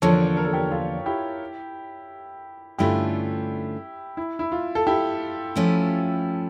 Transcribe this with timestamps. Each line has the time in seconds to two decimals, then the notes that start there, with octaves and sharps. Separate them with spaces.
0.02 E2 D3 F3 A#3 D4 A4 C#5
0.37 A#4
0.45 A4
0.53 G4 A#4
0.71 F4 A4
1.06 E4 G4
2.78 G2 D3 A3 C#4 E4 F4 G4
4.17 E4
4.39 E4
4.52 F4
4.75 A4
4.87 E4 G4
5.56 F3 A3 C#4 E4